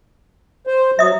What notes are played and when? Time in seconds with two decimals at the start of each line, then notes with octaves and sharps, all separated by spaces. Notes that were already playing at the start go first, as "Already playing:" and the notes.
0.67 C5
0.99 F#3 E5 D#6